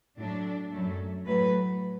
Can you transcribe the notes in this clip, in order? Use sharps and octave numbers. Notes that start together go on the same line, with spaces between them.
A2 F#3 A3 D4
F#2 F#3 A3
A2 F#3 A3 B4